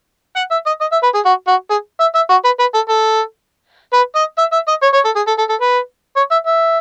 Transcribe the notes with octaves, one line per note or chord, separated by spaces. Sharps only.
F#5
E5
D#5
D#5
E5
B4
G#4
F#4
F#4
G#4
E5
E5
F#4
B4
B4
A4
A4
B4
D#5
E5
E5
D#5
C#5
C#5
A4
G#4
A4
A4
A4
B4
C#5
E5
E5